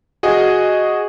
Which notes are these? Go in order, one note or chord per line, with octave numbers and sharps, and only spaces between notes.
F#4 G#4 D#5